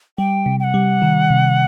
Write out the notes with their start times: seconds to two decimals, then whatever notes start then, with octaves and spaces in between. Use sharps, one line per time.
0.18 G3 G5
0.46 C3
0.60 G5
0.64 F#5
0.74 G3
1.02 D#3
1.30 C3